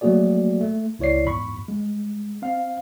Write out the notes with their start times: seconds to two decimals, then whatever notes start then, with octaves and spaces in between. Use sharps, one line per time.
0.01 F#3 A3 A#3 F#4 G#4 D5
0.60 A3
0.99 C#2 E4 C#5 D5 C7
1.25 E2 G#2 B5 C#6
1.68 G#3
2.42 C4 F5